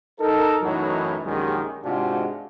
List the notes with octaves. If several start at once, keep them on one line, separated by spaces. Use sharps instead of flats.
D#4 A4 A#4
F#2 A2 E3 F#3 D#4
A#1 F#2 D#3 G#3 C#4 G4
G#2 C3 G#3 D4 F4 F#4